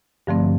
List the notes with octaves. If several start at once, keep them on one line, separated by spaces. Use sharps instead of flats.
G2 D3 F3 A3 C4